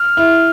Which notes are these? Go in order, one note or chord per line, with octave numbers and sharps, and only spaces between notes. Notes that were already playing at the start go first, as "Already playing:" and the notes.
Already playing: F6
E4